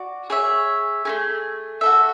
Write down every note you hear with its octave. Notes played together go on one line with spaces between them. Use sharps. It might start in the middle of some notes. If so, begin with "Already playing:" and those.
Already playing: F#4 D5
G#4 C#5 E5
A3 C#4 G#4
F#4 A4 E5